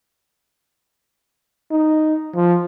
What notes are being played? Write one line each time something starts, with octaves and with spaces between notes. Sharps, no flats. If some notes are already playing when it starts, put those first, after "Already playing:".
D#4
F3